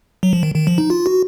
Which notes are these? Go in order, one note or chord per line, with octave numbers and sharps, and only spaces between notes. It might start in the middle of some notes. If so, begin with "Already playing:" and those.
F#3
F3
D#3
D#3
F3
D#4
F4
F#4